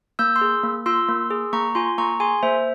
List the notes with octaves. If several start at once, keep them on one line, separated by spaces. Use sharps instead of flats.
A#3 E6 G6
C6 E6
G#4
A#3
F4 C6 E6
A#3
G#4
A#3 A#5 C#6
F4 G#5 C6
A#3 A#5 C#6
G#4 G#5 C6
A#3 C5 E5